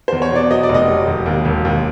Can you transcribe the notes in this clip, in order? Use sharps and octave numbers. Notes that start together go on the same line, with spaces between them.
E2 C5
C#5
B2 D5
F#3 D#5
D5
F1
D#5
F#3
E1
D#2
E1
D#2